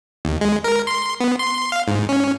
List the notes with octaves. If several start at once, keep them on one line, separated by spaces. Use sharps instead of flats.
D#2
G#3
A#4
C6
B3
C6
F5
G#2
C#4